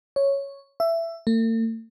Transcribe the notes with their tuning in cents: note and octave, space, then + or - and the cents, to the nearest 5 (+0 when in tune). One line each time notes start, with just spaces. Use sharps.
C#5 +0
E5 +15
A3 +45